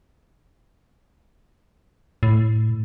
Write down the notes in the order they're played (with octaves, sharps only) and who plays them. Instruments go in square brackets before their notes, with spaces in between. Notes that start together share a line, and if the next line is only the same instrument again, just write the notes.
[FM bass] A2